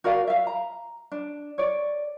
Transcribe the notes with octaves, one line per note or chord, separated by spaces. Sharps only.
F#4 A#4 D5 F5
E5 F5
A#5
D4
C#5 D5